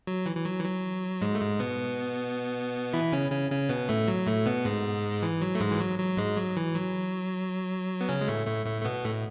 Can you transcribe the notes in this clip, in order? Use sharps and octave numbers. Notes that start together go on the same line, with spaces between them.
F#3
E3
E3
F#3
E3
F#3
G#2 G#3
A3
G#2 G#3
B2 B3
E3 E4
C#3 C#4
C#3 C#4
C#3 C#4
B2 B3
A2 A3
F#3
A2 A3
B2 B3
G#2 G#3
E3
F#3
A3
G#2 G#3
E3
F#3
F#3
G#2 G#3
F#3
E3
F#3
B3
C#3 C#4
G#3
A2 A3
A2 A3
A2 A3
A3
B2 B3
A2 A3